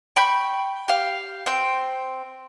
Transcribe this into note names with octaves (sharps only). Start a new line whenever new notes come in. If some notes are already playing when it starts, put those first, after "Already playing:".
G5 B5 C#6 G6
G4 F5
C4 G5